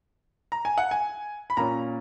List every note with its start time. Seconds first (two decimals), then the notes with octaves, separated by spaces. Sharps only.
0.52 A#5
0.65 G#5
0.78 F#5
0.91 G#5
1.50 B5
1.57 A#2 A#3 C#4 A#5